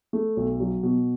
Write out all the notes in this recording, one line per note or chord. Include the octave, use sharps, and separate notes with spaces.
A3
B1
F#3
B2